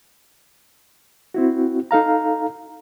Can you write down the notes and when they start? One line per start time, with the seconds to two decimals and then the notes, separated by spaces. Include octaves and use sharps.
1.34 C4 E4 F#4
1.91 D#4 A4 F5 A#5